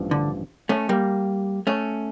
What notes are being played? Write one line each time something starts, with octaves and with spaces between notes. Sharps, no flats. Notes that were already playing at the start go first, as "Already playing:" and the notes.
Already playing: A1 G2 F3
D3
A3 C#4
G3 A#3
A3 C#4